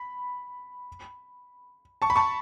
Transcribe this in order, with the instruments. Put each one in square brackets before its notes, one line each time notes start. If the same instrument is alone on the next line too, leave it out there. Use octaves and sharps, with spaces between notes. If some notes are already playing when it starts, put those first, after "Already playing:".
Already playing: [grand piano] B5
A5 C#6
B5
A5 C#6